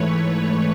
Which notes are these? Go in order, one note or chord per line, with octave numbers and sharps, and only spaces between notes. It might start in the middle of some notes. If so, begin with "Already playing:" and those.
Already playing: G#2 E3 A3 B4 C#5